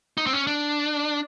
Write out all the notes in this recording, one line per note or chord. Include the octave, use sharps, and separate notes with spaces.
D#4
C4
C#4
D4